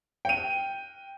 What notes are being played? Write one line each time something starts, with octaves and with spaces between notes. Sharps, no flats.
G5 D#7